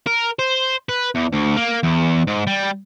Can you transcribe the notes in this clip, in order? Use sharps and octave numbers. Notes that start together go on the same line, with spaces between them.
A#4
C5
B4
E2
D2
A#3
E2
G#2
G3